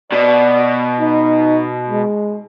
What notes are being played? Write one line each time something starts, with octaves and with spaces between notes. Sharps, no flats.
B2 D5
D#4
G#3